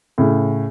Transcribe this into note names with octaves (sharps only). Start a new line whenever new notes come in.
A2 C#3